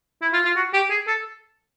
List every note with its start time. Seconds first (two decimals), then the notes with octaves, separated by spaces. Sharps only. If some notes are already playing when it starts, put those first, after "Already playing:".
0.22 E4
0.33 F4
0.45 F4
0.56 F#4
0.73 G4
0.90 G#4
1.08 A4